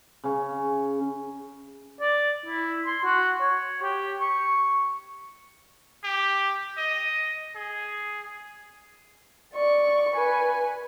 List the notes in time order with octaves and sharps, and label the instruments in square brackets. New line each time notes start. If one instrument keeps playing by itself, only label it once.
[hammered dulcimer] C#3 C#4
[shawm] D5
E4
C6
F#4
C#5
G4
C#6
[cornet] G4
D#5
G#4
[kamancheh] D5 C#6
B4 G#5